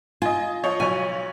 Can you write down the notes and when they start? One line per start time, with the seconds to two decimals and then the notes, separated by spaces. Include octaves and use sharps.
0.22 F4 D#5 G#5
0.64 F3 C#5 D#5
0.80 B1 F#3 C#5 G#5